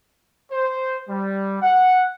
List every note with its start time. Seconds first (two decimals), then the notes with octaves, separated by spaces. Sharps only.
0.52 C5
1.09 G3
1.61 F#5